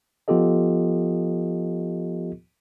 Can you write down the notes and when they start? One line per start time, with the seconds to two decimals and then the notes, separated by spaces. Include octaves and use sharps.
0.28 F3 B3 F4 G4 A4 D#5